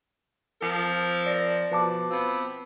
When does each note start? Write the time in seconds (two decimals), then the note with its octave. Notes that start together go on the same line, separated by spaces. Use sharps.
0.62 F3 C4 A#4
1.26 D5 A#6
1.72 B2 F3 B4 A5 D6
2.11 B3 C4 F4